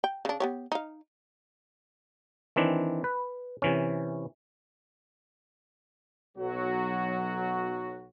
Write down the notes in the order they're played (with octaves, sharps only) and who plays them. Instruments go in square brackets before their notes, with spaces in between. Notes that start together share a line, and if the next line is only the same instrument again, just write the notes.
[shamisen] G5
C#3 D4
B3 G4 C#5
D#4 F5
[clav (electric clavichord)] D#3 E3 C4 D4
B4
C3 E3 C#4
[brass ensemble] B1 F#3 F#4